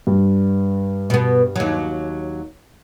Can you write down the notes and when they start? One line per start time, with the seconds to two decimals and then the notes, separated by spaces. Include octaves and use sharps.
0.07 G2
1.10 B2 B3
1.56 D#2 F#3